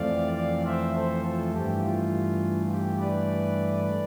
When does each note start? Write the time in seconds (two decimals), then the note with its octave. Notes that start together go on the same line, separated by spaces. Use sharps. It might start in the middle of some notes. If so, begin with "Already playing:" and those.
Already playing: F2 E3 A3 C4 D5 F5
0.36 D5 F5
0.65 C5 E5
0.95 A4 C5
1.24 F4 A4
1.53 G2 E3 A3 G4
1.83 F4
2.70 G4
2.99 B4 D5